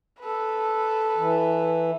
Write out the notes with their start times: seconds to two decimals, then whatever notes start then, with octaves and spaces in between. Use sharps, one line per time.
0.20 A4 B4
1.17 E3